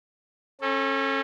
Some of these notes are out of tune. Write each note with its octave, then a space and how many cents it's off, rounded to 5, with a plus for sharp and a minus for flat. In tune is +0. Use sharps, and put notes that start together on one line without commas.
C#4 -30 A4 +0